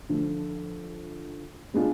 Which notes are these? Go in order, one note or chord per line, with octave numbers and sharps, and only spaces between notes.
D3 F3 A3 D4 F4
B2 G#3 B3 D4 F4